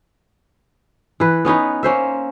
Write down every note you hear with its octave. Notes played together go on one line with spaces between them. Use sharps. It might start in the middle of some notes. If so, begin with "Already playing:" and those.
E3 B4
B3 C#4 D#4 B4
A#3 C#4 C5 E5